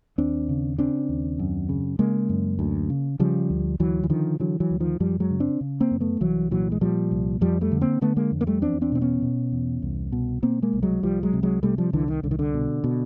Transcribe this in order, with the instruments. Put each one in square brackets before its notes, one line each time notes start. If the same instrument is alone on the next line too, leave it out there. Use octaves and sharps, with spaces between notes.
[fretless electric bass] D#2 C4 D4
C#3
C#3 C4 D4
D#2
F#2
C#3
C#3 G#3 A#3
F#2
D2
C#3
C#3 F3 G3
D2
D2 E3 F#3
E3
D3 D#3 F3
D3 E3 F#3
E3 F#3
D2
D#3 F3
F#2 F3 G3
F#3 G#3
C#3
C4 D4
C#3
A#3 C4
F#2
A3 B3
C2 E3 F#3
A#2 E3 F#3
G#3
A#2 F3 G3
C2
F2 F3 G3
G3 A3
D3
A#3 C4
D3 A3 B3
G#3 A#3
F2
A#3
G3 A3
E2 C4 D4
C4 D4
B2 C4
B3 C#4
B2
E2
C2
B2
B2 A#3 C4
G#3 A#3
C2
F#3 G#3
C2 F3 G3
F#3 G#3
C3
F#3 G#3
C3 G3 A3
F3 G3
C2 D3 E3
D#3
C2 D3
D#3
D3
B2
B2